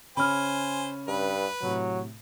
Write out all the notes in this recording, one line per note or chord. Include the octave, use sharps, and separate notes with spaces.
C#3 C#4 C5 G#5 B5 F6
G2 B4
A2 C3 F#3